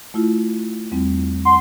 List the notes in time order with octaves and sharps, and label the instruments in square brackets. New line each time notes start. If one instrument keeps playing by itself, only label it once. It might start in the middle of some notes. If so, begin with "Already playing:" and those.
[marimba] A3 E4 F4
E2 G3 C4
[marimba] F#5 [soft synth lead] C6